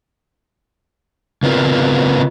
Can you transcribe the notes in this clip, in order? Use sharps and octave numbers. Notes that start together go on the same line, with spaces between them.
C#3 B3 C4 F4 A#4